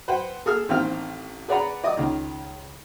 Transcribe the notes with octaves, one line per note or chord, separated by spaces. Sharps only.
B4 C5 F#5 G5
G#4 A4 D#6 F6
A1 D#3 C4 F5 G5 F6
G#4 B4 D5 F#5 A#5 B5
D5 D#5 D6 D#6
C#2 D#3